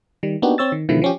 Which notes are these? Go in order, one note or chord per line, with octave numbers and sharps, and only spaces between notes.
D#3 G3
A#3 B3 D4 D#4 F#4 G4
C4 C#5 E6 A6
D#3
B2 D3 D#3 F3 G#3 E4
F3 C#4 G4